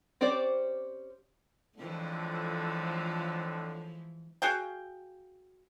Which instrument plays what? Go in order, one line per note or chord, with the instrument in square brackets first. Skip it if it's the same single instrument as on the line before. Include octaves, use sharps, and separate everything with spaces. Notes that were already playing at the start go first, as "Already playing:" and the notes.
[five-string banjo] C4 C#4 G4 C5 D5
[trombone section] F2 A2 D3 [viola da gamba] E3 F3 G#3
[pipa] F#4 G#4 F5 G5